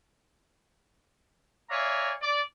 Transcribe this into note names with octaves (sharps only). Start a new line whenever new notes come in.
C#5 D5 E5 F5 G#5 A#5
D5